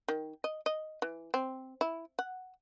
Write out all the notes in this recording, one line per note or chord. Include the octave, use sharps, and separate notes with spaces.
D#3
D#5
D#5
E3
C4
E4
F#5